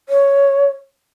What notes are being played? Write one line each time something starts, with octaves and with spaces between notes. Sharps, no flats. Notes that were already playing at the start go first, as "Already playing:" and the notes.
C#5